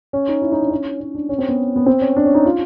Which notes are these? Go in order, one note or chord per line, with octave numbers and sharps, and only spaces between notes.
C#4
D#4
E4
D#4
D4
C#4
C#4
D4
C#4
C4
B3
B3
C4
C#4
D4
C#4
D#4
F4